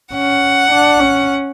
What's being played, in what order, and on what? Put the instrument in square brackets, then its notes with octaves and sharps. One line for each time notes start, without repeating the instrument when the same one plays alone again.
[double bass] C#4 [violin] F#5
[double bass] D4
C#4